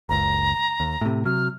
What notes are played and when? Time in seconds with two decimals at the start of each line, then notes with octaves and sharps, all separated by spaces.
0.09 F#1 C#2 A#5
0.80 D#2
1.01 A2 C3
1.25 C3 F#3 F6